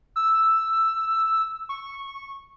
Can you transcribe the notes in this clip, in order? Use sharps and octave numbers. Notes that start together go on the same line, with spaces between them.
E6
C#6